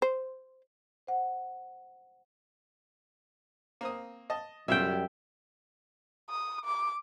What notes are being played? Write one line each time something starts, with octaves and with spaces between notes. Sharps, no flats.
C5
C5 F#5
A#3 C4 D#6
D#5 A5
B1 F#2 C#3 G3 F4 E5 G5
D#6
D6